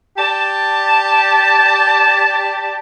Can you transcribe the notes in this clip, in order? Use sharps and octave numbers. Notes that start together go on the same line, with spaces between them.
G4 D5 A5